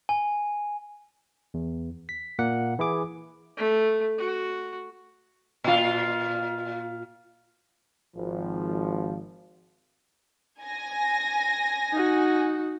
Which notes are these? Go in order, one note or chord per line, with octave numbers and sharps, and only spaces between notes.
G#5
E2
B6
A#2 A#3 F#5
E3 E4 G#4 D6
A3
F#4
A#2 F4
G#1 F3
G#5 A#6
D#4 F#4